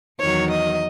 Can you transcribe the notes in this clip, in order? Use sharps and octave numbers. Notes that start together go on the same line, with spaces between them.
E2 D#3 F#3 C#5
D#5